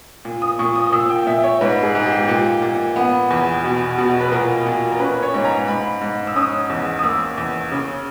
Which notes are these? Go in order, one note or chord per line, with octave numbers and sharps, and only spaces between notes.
A#2
D#6
A#2 C#6
D#6
D#6
A#2 E6
G5
A#2 E5
C#5
G#2 B4
G#4
G#2
G4
A#2 G4
A#2
B3
E2
B2
B2
B4
A#2 A#4
A#2
A#4
C#4 B4
C#5
G#2
A#5
G#2 B5
G#2
E6
C#4 D#6
E2
D#6
A#3 E6
E2
C#3